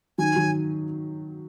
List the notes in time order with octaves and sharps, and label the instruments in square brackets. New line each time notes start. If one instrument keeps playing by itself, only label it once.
[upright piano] D#3 F#3 [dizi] G#5
[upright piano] D#3 F#3